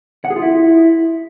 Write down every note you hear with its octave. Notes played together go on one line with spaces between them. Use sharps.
F#5
G#4
F4
E4